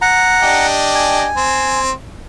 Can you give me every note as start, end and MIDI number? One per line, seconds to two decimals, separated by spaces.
0.02 0.66 78
0.02 0.66 82
0.42 1.27 62
0.42 1.27 67
0.42 1.27 75
0.95 1.80 80
1.36 1.91 60